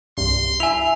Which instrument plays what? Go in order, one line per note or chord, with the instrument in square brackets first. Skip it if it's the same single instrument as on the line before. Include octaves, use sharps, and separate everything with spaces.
[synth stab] C2 G2 [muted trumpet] C6
[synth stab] E4 E5 [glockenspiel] G#5 F7